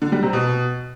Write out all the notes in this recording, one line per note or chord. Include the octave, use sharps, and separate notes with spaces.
D3
G3
C3
B2